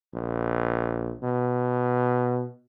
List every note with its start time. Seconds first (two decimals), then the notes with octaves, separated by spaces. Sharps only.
0.14 A#1
1.23 B2